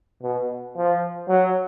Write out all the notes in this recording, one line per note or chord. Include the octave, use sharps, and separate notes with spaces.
B2
F3
F#3